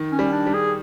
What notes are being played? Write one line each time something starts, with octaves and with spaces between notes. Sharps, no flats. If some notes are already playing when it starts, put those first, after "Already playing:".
Already playing: D#3
C#4
G3
D4
G3
G#4